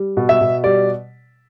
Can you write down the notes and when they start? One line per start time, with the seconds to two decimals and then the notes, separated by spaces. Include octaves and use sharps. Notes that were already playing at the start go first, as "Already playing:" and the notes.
Already playing: G3
0.17 B2
0.29 E5
0.41 B2
0.64 G3 D5